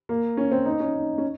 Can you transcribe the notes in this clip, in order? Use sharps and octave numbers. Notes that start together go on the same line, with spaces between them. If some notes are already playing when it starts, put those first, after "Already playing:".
A#3
C#4
C4
D#4
C#4
D#4
C#4